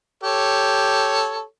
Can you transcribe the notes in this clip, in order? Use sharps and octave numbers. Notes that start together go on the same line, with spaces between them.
G4 A4 C#5